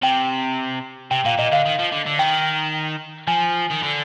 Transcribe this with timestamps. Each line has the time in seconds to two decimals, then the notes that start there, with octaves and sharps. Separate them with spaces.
0.02 C3 G5
1.11 C3 G5
1.25 A#2 F5
1.38 A#2 D#5
1.52 D3 F5
1.66 D#3
1.79 F3
1.92 D3
2.06 D3
2.19 D#3 G5
3.28 F3 G#5
3.70 D#3
3.83 D3